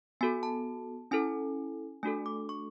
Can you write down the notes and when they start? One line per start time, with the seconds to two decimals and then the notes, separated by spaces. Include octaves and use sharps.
0.21 B3 F#4 A4 G#5
0.43 A5
1.11 C#4 E4 A4 G#5
2.03 A3 D4 F#4 A4 G#5
2.26 D6
2.49 C#6